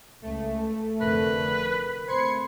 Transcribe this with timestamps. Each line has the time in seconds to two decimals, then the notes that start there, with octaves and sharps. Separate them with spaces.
0.22 C#2 A3
1.01 F1 D3 A#4 B4
2.08 C3 A3 C5 B5 C6 G#6 C7 C#7